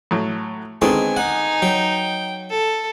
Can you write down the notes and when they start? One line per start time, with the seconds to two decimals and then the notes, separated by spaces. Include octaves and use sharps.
0.11 A2 F#3
0.82 D3 D#3 G#3 B3 C4 G#5 C6
1.17 D#4 F#5
1.62 F#3 G5
2.50 A4